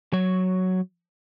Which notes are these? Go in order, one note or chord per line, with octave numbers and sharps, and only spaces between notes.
F#3 C#5